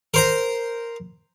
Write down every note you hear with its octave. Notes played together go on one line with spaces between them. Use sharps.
A#4 C5 A#5